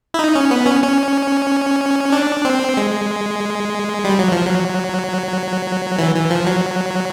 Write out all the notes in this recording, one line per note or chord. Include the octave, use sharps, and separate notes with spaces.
E4
D#4
C#4
B3
C#4
C#4
D4
C4
G#3
G3
F#3
F3
F#3
E3
E3
F3
F#3